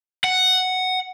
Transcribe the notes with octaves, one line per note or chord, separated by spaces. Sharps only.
F#5